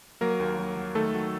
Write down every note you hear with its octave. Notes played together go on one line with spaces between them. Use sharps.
F#3 A#3 A#4
D#2
F#3
F#3
D#3 A3 A4
F#3